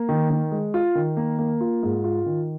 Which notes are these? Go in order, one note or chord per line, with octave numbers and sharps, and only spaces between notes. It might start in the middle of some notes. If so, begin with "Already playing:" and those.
Already playing: A#3
D#3
D#3
G#3
F4
D#3
A#3
A#3
F4
G#2
F4
D#3